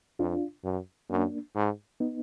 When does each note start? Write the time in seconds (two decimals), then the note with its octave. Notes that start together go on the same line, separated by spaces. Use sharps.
0.19 F2 D4 F4
0.64 F#2
1.10 F#2 A#3 D4
1.56 G#2
2.00 B3 D#4